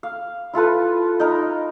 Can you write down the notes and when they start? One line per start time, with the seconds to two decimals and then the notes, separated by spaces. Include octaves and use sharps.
0.03 F5
0.53 E4 F4 A4 B4
1.20 D#4 A#4